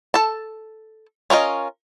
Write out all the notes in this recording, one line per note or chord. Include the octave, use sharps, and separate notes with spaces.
A4 A5
C#4 F4 A#4 D#5